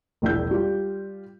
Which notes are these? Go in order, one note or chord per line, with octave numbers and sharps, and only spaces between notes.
E1 A#1 E4 G6
G3 F4 G4